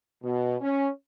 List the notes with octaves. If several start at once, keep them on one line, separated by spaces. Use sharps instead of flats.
B2
C#4